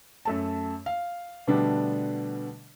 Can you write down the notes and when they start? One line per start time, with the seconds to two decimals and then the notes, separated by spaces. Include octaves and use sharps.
0.25 F#2 A3 A5
0.86 F5
1.47 B2 D3 G3 A3 B3 D4